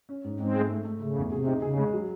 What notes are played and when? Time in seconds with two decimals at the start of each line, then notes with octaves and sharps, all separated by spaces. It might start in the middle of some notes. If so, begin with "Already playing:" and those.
0.09 C#4
0.24 G#2
0.39 G#2 G#3 C4
0.54 A3
0.70 A3
0.85 A3
1.00 C#3 A3
1.17 E2
1.31 C3 G#4
1.47 D#4
1.62 C#3 G#4
1.77 G#3
1.93 F#3